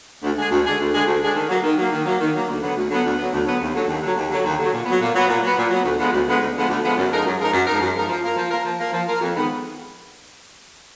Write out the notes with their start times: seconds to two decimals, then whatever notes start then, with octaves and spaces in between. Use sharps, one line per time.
0.23 D2
0.38 D3 G#3 D4 G#4
0.51 D2
0.66 D3 G#3 D4 G#4
0.80 D2
0.93 D3 G#3 D4 G#4
1.07 D2
1.22 D3 G#3 D4 G#4
1.36 D#3
1.49 F#3 A#3
1.64 D#3
1.78 F#3 A#3
1.91 D#3
2.06 F#3 A#3
2.20 D#3
2.34 F#3 A#3
2.48 D2
2.61 D3 F#3 B3
2.76 D2
2.90 D3 F#3 B3
3.05 D2
3.18 D3 F#3 B3
3.33 D2
3.46 D3 F#3 B3
3.60 D#2
3.74 D3 F#3
3.88 D#2
4.02 D3 F#3
4.16 D#2
4.31 D3 F#3
4.45 D#2
4.58 D3 F#3
4.72 A#2
4.86 F#3 B3
5.01 A#2
5.14 F#3 B3
5.28 A#2
5.43 F#3 B3
5.57 A#2
5.70 F#3 B3
5.84 D2
5.99 D3 F3 G#3 B3
6.13 D2
6.26 D3 F3 G#3 B3
6.41 D2
6.55 D3 F3 G#3 B3
6.69 D2
6.82 D3 F3 G#3 B3
6.97 F#2
7.10 F3 G#3 D#4 A#4
7.25 F#2
7.39 F3 G#3 D#4 A#4
7.52 F#2
7.67 F3 G#3 D#4 A#4
7.81 F#2
7.95 F3 G#3 D#4 A#4
8.09 F3
8.24 A#3 F4 A#4
8.37 F3
8.51 A#3 F4 A#4
8.65 F3
8.80 A#3 F4 A#4
8.93 F3
9.07 A#3 F4 A#4
9.21 F2
9.36 D#3 G#3 B3